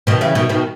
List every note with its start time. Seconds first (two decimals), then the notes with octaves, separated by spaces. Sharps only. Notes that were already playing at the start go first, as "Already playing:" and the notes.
0.07 B2 D#3
0.21 C#3 E3
0.35 B2 D#3
0.49 B2 D#3